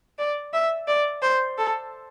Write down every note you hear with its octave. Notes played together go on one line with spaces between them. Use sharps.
D5
E5
D5
C5
A4